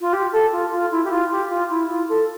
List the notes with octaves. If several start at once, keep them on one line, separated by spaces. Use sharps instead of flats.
F4
G4
A4
F4
F4
E4
G4
F4
G4
F4
E4
F4
A4